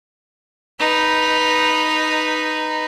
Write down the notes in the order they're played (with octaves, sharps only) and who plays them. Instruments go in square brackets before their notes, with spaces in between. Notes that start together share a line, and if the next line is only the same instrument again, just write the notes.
[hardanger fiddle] D#4 B4